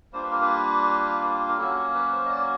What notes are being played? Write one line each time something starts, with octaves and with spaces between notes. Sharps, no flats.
G3 A#3 D4 F4 C5
B4
A#4
B4
A#4
F#3 A#3 C#4 F#4 A4
B4
C5
D#5
D5